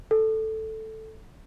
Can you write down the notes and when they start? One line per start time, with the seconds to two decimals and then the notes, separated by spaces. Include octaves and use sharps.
0.11 A4